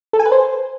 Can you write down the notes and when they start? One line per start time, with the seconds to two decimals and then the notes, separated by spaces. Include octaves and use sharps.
0.13 A4
0.19 G#5
0.26 B4
0.32 C5